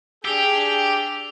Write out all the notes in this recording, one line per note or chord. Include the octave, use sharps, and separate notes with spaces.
D4 G4 G#4 G5 E6 F7